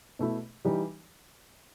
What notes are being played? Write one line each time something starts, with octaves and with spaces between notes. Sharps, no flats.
B2 A3 E4
E3 G3 D#4 G4